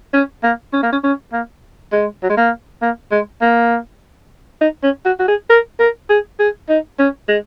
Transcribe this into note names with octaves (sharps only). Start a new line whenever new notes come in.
C#4
A#3
C#4
A#3
C#4
C#4
A#3
G#3
F#3
G#3
A#3
A#3
G#3
A#3
D#4
C#4
F#4
F#4
G#4
A#4
A#4
G#4
G#4
D#4
C#4
G#3